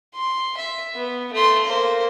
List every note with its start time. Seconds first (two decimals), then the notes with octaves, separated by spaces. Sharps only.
0.14 C6
0.57 E5
0.95 B3
1.33 A3 C6
1.66 A#3 C5